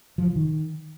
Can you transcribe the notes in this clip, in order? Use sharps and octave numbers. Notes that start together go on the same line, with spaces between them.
F3
D#3